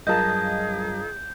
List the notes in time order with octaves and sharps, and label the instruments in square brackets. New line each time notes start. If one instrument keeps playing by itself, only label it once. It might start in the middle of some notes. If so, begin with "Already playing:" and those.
[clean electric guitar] G2 F#3 A5 [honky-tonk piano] F4 A#4 D#5 [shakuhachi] G#4 [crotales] G6